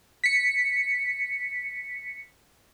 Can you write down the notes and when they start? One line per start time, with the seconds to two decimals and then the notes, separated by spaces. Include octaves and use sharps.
0.24 B6 C#7